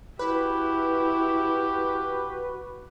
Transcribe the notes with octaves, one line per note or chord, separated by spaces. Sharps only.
E4 F#4 G4 B4